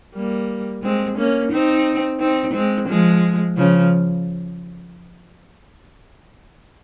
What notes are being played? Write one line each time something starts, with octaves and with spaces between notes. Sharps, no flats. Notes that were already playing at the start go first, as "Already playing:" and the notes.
G3 A#3
G#3 C4
A#3 C#4
C4 D#4
C4 D#4
G#3 C4
F3 G#3
C#3 F3